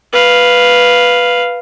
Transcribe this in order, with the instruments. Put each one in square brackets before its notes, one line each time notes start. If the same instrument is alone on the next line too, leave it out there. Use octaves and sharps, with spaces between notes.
[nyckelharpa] B4 F5